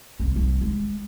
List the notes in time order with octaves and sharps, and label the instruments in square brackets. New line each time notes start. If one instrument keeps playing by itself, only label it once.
[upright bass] C2
C2
G#3